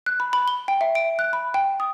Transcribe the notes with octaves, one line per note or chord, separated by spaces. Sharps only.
F#6
B5
B5
G7
G5
E5
D7
F#6
B5
G5
D#6